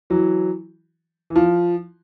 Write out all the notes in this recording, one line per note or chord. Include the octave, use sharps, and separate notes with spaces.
E3 F#3
E3
F3